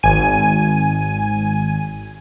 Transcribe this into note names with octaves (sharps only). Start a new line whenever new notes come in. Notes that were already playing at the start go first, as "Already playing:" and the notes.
G#1 G#5 D#7